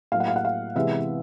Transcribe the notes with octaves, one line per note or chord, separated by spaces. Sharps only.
A2 F#3 A#3 F5
F#5
F5
F#5
F5
C3 E3 G#3 B3 E5